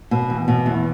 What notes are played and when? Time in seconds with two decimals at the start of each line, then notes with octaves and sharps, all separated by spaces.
0.11 B2
0.30 E2
0.48 B2
0.66 E2